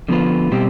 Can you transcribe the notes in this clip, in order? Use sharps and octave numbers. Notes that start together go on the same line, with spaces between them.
D3 F3 B3 F4 B4
B2 G3 C4 G4